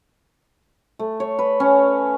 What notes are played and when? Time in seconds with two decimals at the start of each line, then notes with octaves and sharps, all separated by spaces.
0.99 A3
1.20 C#5
1.39 B4
1.60 C#4